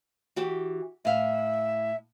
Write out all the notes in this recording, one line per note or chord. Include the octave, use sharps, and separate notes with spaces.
E3 F#4 G4
A2 E5 F5